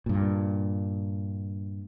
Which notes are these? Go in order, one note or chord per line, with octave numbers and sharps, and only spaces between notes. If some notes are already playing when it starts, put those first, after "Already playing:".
G2 A#2